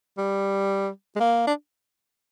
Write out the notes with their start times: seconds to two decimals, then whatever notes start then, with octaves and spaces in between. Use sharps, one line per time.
0.18 G3
1.16 G#3
1.20 A#3
1.47 D4